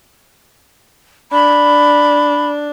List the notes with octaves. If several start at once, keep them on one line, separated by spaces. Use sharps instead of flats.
D4 B5